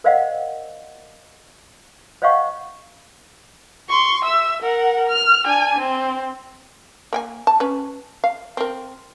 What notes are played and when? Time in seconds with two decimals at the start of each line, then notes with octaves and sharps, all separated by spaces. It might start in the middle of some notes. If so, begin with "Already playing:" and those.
0.04 A#4 C5 D5 D#5 F5 F#5
2.22 C5 C#5 D#5 F5 F#5 C#6
3.89 C6 C#6
4.25 E5 E6
4.63 A#4 F#5
5.09 F6
5.46 D4 G#5
5.79 C4
7.13 A#3 G5 G#5
7.47 A5
7.60 C#4 B4
8.24 F5
8.57 C4 A#4